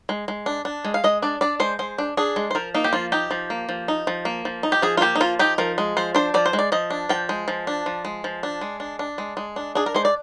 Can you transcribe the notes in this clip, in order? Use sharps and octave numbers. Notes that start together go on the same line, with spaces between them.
G#3
G#3
D4
D4
G#3
F5
G#3 D#5
D4 D5
D4 D5
G#3 C5
G#3 C5
D4
D4 G#4
G#3
C5
F3 A#4
A#3 D#4
G4
F3 F4
D#4 G4
F3
A#3
F3
D#4
F3
A#3
F3
D#4
G4
F3 G#4
F4
A#3 G4
D#4
F3 F4
D#4 G4
F3 A#4
G#3
F3 C5
D4 C5
F3 D5
C5
G#3
D5
F3 D#5
D4
F3 G5
G#3
F3
D4
F3
G#3
F3
D4
G#3
D4
D4
G#3
G#3
D4
D4 G#4
A#4
G#3 C5
D5